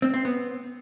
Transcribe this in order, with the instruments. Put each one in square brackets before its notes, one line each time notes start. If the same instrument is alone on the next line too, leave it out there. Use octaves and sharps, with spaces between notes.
[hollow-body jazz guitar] C4
C4
B3